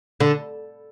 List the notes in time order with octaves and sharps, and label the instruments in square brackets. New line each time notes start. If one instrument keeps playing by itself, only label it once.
[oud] D3